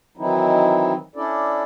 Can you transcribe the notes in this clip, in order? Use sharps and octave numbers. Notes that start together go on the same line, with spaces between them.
D#3 E3 F#3 C4 D#4 E4
C#4 D4 E4 A4 D5